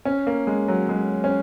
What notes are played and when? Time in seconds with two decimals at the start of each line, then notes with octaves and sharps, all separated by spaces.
0.05 C#4
0.27 A#3
0.47 G#3
0.68 F#3
0.89 G#3
1.24 C#4